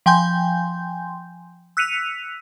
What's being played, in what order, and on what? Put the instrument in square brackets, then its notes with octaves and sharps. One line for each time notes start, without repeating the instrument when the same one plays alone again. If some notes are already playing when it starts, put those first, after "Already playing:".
[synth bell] F3 G5 G#5 C6 G6
E6 F#6 B6 C#7 D#7 F7